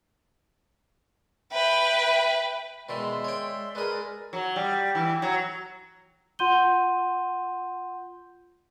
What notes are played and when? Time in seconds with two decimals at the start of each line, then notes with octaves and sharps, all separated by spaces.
1.52 B4 E5 G5
2.89 B2 D#3 E3 G#3 D5 E5 C6
3.24 C#5 G5
3.75 G#3 G#4 A#4 B4 D5
4.33 F#3
4.56 G3
4.95 E3
5.22 F#3
6.39 F4 F#5 C6 G6 D#7 G7